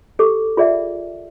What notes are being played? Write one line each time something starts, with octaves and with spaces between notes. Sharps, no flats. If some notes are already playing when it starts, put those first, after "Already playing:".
G4 A4 D6
F4 G#4 D5 E5 F#5